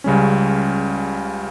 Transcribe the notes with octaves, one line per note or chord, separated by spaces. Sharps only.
C#2 C#3 G3 C#4